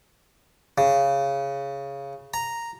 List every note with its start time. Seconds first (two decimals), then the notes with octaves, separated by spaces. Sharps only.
0.78 C#3
2.34 A#5